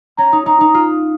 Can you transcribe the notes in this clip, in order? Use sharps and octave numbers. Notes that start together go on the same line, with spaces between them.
C#4 A#5
D#4
D#4 A#5
D#4
F4